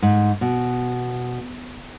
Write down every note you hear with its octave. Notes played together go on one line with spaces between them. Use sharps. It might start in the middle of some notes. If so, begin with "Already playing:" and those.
G#2
B2